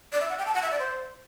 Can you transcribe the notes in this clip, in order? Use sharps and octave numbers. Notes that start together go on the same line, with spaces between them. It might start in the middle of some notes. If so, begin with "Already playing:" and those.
D5
E5
F#5
G5
A5
F#5
E5
D5
C5